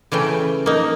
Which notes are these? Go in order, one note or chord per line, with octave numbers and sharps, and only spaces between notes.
C#3 E3 A3 G5
A#3 D#4